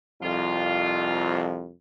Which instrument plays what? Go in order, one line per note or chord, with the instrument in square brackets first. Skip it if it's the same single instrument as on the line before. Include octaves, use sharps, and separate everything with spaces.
[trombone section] C2 F2 [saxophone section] F4